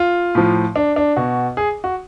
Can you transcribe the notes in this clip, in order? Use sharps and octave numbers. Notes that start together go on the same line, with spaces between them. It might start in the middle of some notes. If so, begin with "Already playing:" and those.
Already playing: F4
A2 F3
D4
D4
B2 F#4
G#4
F#4